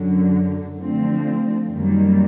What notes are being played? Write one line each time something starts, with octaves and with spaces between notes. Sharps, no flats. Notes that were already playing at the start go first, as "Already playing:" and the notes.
Already playing: F#2 D3 F#3
D3 F3 A3 C4
F#2 D#3 G3 A#3